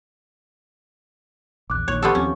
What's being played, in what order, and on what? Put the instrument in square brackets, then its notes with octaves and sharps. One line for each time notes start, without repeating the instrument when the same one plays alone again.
[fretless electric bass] A#1 E2 [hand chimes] D6 F#6
[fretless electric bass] A#1 A#2 D#3 [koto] C#5
[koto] B3 F4 A4 [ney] G4 [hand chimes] F5 C#6 G6
[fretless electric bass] D#2 F3 C4 [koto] C#4